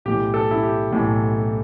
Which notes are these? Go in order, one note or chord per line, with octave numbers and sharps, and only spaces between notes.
B1 A2 E3 G4
A4
E4
G4
B1 A2 E3